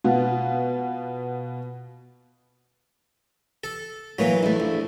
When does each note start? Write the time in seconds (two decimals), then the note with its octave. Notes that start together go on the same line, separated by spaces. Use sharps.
0.04 B2 B3 F4
3.64 A4
4.19 E3 F#3 A#3 B4
4.43 E2 A3 E4
4.60 A#1